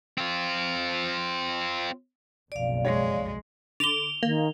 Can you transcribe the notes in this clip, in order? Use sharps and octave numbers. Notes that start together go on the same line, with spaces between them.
C4 F4
F#1 B1 F2 D5 F5
G#3 C#5
D3 D6 E7 F7 G7
D#3 A#3